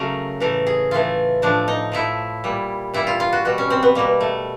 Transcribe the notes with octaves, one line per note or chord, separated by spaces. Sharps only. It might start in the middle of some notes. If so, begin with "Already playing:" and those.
Already playing: C#3 F#3 A3 F#4 A#4
A2 E3 A3 A#4
G#4
A2 E3 A3 F4
A2 F3 A3 D4
D#4
A2 F3 A3 E4
A#2 G3
A#2 G3 E4
F4
F4
F#4
B2 G3 F#4
C#4
C4
B3
B2 G3 A#3
A3